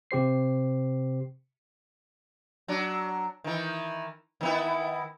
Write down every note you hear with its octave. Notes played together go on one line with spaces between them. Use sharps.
C3 G4 C5 C7
F#3 D4
D#3 E3
D#3 B3 E4